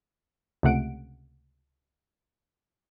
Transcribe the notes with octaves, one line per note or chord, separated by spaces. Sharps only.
C#2 C3 A3 F#5 D7